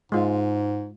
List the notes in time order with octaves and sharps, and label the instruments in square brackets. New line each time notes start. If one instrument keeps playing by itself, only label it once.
[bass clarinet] G#2 [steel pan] G#3 F4